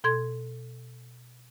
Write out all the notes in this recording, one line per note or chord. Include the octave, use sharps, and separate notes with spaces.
B2 A4 C6 G#6